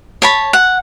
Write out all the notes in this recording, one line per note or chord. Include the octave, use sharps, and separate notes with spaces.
C#5 A5 B5
F#5